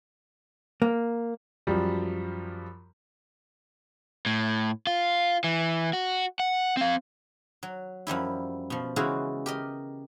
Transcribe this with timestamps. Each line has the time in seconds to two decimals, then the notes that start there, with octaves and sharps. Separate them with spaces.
0.82 A#3
1.67 F#2 F3 G3
4.26 A2
4.87 F4
5.44 E3
5.93 F#4
6.40 F#5
6.77 C4 F5
7.63 F#3
8.07 F#2 F3 G3 E4
8.70 B2 F3
8.96 C#3 E3 G#3 E4 F#4 F5
9.46 G4 A#4 D#5